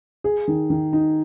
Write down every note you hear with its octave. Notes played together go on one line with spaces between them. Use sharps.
G#4
D#3
D#3
D#4